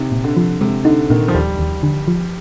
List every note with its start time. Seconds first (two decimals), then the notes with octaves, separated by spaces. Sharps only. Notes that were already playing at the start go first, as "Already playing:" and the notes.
Already playing: C3 D#4
0.12 A#2
0.24 D3
0.36 F3
0.61 C3 G#3
0.85 D3 D#4
1.10 A#2 D#3
1.28 F3
1.34 D#2 G3
1.59 D#2
1.83 D3
2.08 F3